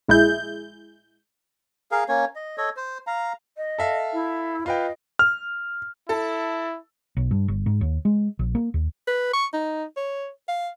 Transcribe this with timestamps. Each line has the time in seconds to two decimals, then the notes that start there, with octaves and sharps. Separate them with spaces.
0.08 A#1 G#3 E4 G#4 G6
1.91 G#4 A#4 F5
2.09 A#3 C#4 C#5
2.35 D#5
2.58 A4 C#5 D#5
2.76 C5
3.07 F5 A#5
3.56 D#5
3.78 A4 E5 F5
4.12 E4
4.66 F4 B4 D#5 G5
5.19 F6
6.09 E4 A4
7.17 B1
7.31 G2
7.48 G1
7.66 G#2
7.81 D#2
8.05 G#3
8.39 A#1
8.55 A#3
8.74 D#2
9.07 B4
9.33 C#6
9.54 D#4
9.97 C#5
10.48 F5